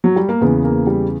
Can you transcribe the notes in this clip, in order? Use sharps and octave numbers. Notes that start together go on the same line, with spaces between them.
F#3
G3
A#3
E2 C#3 E3 B3
A#3
G3